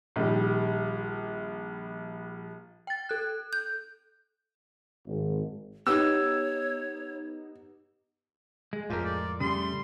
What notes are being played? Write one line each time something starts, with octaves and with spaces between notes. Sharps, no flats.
A#1 D#3 G3
G5 A6
A4 F#6
G6
G#1
B3 D#4 G4 C#5 E6
G#3
F2 A2 F4 G4 A4 A#4
D5
C#3 G3 A3 C6